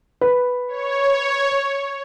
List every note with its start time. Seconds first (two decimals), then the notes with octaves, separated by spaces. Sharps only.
0.21 B4
0.68 C#5